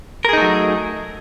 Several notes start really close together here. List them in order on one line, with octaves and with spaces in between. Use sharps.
A#4 G#4 D#4 A3 F#3